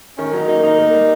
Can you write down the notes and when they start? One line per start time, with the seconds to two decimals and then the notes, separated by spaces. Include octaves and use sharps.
0.18 D#3 C#4
0.33 F#3 D#4
0.48 A#3 D#4
0.63 D#3 D#4
0.78 A#3
0.93 G3